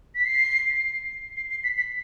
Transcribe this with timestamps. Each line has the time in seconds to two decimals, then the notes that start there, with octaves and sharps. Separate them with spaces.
0.15 B6
0.25 C7
1.36 C7
1.50 C7
1.64 B6
1.78 B6